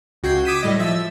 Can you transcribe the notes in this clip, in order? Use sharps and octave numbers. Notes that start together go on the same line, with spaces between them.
C#2 F#4 G5 G#6 C7
D6 D#6 G#6 B6 D#7 E7
A2 G3 D#5
F3 E5 E6 A6